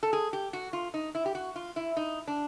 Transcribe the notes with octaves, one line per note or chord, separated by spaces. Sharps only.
A4
G#4
G4
F#4
F4
D#4
E4
G4
F#4
F4
E4
D#4
D4